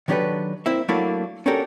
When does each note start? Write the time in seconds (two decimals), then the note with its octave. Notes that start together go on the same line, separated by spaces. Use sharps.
0.08 D#3 F#3 D4 G4 A4 B4
0.66 A#3 C4 E4 E5
0.88 F#3 A3 A#3 D4 E4 F#4
1.46 C#4 D4 F#4 G4 A4 A#4